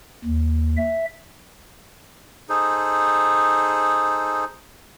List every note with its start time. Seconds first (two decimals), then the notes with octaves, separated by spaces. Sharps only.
0.25 D#2
0.77 E5
2.49 D#4 G#4 A4 C5